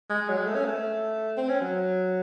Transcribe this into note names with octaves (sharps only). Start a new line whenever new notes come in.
G#3
F#3
G#3
A3
C#4
A3
C4
C#4
F#3